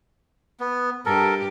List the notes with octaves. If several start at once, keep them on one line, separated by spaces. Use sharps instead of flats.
B3
G2 G4 A4 A#4